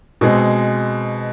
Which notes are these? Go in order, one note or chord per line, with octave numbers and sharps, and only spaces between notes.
B2 G#3 C4